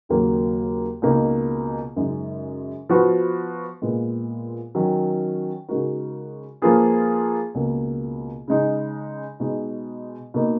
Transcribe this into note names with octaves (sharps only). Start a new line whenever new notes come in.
D#2 C#3 F#3 A#3
C#2 B2 A#3 D#4
F#2 C#3 G#3 D#4
F3 B3 F#4 B4
A#2 G#3 B3 F4
D#3 F#3 C#4
C#3 G#3 D#4 F#4 A#4
F3 A#3 F4 G#4 B4
C#2 B2 A#3
C#3 G#3 D#4
B2 G#3 D#4
B2 A#3 D#4